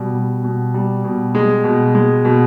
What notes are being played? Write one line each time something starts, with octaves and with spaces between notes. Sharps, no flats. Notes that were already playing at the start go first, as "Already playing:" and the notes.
Already playing: B2 G3
G3
B2
G3
B2
G#3
B2
G#3
B2